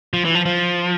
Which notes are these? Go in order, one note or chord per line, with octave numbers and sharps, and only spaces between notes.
F3
E3
F3
F3